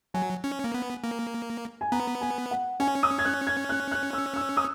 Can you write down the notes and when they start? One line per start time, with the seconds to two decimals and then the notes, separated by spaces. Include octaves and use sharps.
0.14 F#3 G#5
0.44 C#4
0.64 A#3
0.74 B3
1.04 A#3
1.81 G#5
1.92 B3 A#5
2.21 G#5
2.51 F#5
2.80 C#4 G#5
3.03 D#6
3.19 G#6
3.25 F#6
3.47 G#6
3.69 F#6
3.91 F#6
4.13 E6
4.36 E6
4.57 D#6